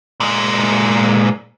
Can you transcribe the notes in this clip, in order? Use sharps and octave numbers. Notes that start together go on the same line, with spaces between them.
A#2 G#3